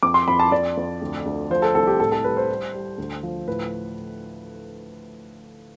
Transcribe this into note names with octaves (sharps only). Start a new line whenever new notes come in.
F2 D6
C6
F2 B5
A5
F2 D5
F2
D2
D2
F3 C5
A4
C2 A4
G4
A2 A4
A4
G3 B4
C5
G3
G3
D2
F3
A2 B4